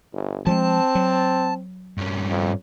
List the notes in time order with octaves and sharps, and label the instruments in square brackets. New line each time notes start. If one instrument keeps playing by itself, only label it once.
[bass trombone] G1
[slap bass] F3 F#3 G#3 [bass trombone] C4 [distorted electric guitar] A5
[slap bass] F#3
[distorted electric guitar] G2 C#4
[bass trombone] F2